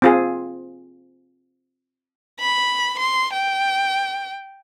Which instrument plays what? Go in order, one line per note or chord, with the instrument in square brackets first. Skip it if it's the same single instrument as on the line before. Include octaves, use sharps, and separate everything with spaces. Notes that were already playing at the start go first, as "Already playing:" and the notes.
[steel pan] C4 F4 G#4
[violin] B5
C6
G5